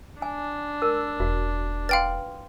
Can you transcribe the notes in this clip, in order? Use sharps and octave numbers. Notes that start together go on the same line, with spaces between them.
D4 G#5
A#4 E6
E1 F#4
B4 F5 G5 C6 A6